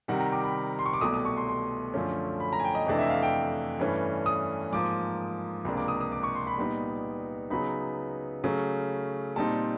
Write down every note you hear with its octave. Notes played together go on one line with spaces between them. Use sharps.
C3 D#3 G3 F#5
A#5
D6
B5
C6
C#6
D6
C2 B2 F#3 A3 D#6
D#6
C#6
C6
C6
F#2 D3 F3 A3 C#4
B5
A#5
G#5
G5
D#5
F2 C3 E3 A3 D4 D#5
E5
F5
G5
G2 E3 A3 C#4
D#6
G#2 F3 A#3 D6
C#2 C3 F3 A#3 D4
D6
D#6
D#6
D6
C#6
C6
B5
A#2 G3 B3 D#4
C#3 F#3 B3 D#4 B5
C#3 F#3 A3 C#4
A#2 G3 C4 D#4 A5